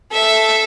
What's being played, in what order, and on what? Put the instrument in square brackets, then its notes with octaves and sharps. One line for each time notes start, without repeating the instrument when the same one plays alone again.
[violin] A4 [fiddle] E5